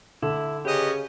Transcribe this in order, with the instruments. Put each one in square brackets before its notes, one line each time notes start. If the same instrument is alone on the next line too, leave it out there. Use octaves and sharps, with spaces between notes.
[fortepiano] D3 [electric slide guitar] E4
[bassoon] C#3 [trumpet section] C#4 B4 D#5 [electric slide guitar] G4